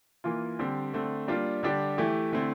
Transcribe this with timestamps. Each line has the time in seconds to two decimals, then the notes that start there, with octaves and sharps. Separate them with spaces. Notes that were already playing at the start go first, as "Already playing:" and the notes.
0.24 E3 A#3 F4
0.59 D3 G3 C4 G4
0.94 D3 A3 C4
1.28 G3 A#3 D4 F4
1.63 D3 G3 D4 G4
1.98 E3 A3 E4 G4
2.32 D3 A3 C4 E4